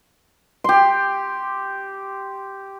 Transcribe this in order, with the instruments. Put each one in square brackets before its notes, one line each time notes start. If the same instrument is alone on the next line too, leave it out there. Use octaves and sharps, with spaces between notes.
[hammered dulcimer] G4 C6